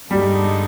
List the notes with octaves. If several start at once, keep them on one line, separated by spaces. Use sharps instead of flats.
G2 D3 G3 G#3 D#4